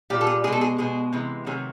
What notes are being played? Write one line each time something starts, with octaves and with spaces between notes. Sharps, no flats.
A#2 G3 G4
A4
G#4
B2 G#3 G#4 A4
G#4
B2 G#3 G#4
C3 E3 G#3
C3 D#3 F#3 A3 G#4